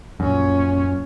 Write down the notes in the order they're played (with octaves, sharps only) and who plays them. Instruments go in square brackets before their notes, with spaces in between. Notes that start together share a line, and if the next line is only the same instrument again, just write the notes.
[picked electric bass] F#2 [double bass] A#2 C#4